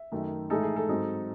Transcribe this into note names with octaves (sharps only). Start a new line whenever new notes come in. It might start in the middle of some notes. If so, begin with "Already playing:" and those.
Already playing: E5
F#2 D#3 A3 D#4
A2 E3 G#3 D#4 A4
G#4
A4
G#2 F#3 C4 D#4